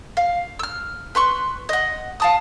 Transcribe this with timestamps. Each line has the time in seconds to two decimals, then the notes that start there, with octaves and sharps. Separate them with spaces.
0.17 F5
0.59 E6 F6
1.15 B4 C6 C#6
1.69 D#5 F#5
2.20 F5 A5 D#6